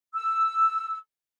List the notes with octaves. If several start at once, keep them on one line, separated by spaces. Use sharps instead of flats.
E6